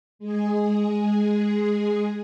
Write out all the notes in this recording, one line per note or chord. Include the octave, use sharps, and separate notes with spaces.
G#3 G#4